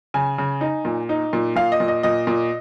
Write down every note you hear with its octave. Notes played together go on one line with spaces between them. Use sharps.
C#3 G#5
C#3
D#4
A#2
D#4
A#2
A#2 F5
D#5
A#2
D#5
A#2 D#5
A#2